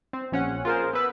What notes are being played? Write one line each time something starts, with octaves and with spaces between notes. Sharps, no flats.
C4
A#1 C#4 F#5
F4 G#4 A#4 C5
B3 B4 E6